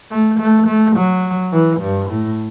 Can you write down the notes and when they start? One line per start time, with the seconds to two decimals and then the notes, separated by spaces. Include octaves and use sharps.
0.11 A3
0.39 A3
0.67 A3
0.96 F#3
1.52 E3
1.81 G2
2.09 A2